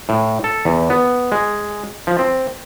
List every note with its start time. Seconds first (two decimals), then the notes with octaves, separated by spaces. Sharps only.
0.09 A2
0.44 A4
0.65 E2
0.90 B3
1.32 G#3
2.07 F3
2.19 C4